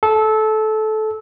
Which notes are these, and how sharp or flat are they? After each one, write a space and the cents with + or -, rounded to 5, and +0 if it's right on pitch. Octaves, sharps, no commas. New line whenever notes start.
A4 -20